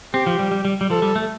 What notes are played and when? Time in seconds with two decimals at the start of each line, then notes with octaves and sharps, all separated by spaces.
0.14 C4 G4
0.26 F3
0.39 G3
0.51 G3
0.65 G3
0.81 G3
0.90 F3 A4
1.02 G3
1.16 A3